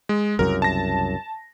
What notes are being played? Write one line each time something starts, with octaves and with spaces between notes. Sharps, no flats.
G#3
C2 F#2 C#3 A#4
A5 A#6